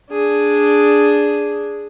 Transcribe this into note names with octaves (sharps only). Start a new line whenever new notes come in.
D4 G#4